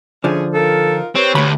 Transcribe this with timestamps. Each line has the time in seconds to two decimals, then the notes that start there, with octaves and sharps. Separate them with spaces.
0.24 D3 F3 C#4 E4 G#4
0.54 D#4 F4 A4 A#4
1.16 C4 G4 B4 C#5
1.35 D2 A3 B5